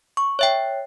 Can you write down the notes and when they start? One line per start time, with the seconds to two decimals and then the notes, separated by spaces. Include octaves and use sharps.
0.17 C#6
0.39 C#5 E5 G5